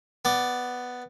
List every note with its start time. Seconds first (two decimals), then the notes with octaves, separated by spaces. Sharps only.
0.25 B3 D5